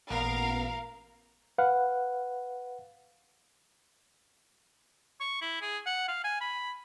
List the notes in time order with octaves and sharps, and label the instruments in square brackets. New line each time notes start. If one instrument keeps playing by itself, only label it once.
[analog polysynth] A1 A#2 B3 [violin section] A#4 F5
[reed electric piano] B4 F5 F#5
[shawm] C#6
E4
G#4
F#5
F5
G#5
B5